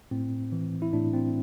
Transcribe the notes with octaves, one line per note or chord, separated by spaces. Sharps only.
A2 C4
E3
E4
A2 D4
C4